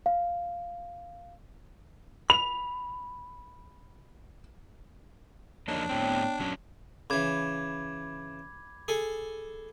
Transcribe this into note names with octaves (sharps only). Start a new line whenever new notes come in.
F5
B5 F7
F2 A#3 D4 D#4 C#5
A2 B3 C4 C#5 G5
A#2 F#3 C#4
C#3 E3 B5 D6 G#6
G#4 A4 G#5